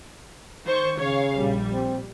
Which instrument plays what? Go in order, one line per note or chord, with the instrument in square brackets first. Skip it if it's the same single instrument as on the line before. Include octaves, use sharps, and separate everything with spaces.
[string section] D#3 C5 C#6
[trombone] C#3 [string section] C#5 F5
[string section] A#1 G3
[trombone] C4